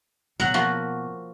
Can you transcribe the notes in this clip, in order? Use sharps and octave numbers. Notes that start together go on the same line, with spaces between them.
B2 F#3 F#5
F3 A#3 F#4